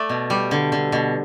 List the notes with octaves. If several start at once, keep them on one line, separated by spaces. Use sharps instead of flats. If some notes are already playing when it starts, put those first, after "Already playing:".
Already playing: A3 D5
B2
G3
D3
D3
B2